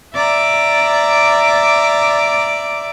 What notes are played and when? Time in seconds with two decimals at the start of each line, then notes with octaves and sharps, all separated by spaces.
0.15 D5 E5 A#5 D6